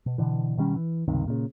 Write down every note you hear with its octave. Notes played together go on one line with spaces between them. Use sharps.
B2
B2 D3 E3
B2 D#3 G3 C#4
E3
C#2 G2 C3 D#3
A#2 C#3